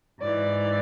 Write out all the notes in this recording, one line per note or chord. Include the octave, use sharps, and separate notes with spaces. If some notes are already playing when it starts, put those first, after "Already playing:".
G#2 E3 D5